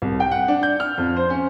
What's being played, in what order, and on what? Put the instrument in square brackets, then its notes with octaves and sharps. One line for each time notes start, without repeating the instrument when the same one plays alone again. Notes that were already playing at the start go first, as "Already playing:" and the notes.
[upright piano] C2
G5
F#5
D4
G6
F6
F2
C5
C#4